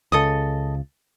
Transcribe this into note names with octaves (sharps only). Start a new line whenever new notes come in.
C#2 C#3 A4 D#5 D#6